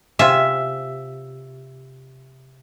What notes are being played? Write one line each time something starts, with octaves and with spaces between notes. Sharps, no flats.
C3 F4 E5 G#5